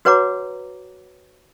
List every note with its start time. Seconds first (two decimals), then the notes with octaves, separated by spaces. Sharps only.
0.05 F#4 B4 C#5 F#5 A#5 D6